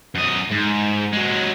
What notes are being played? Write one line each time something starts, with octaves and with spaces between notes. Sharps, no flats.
F#2 D#5
G#2
F#3 G#3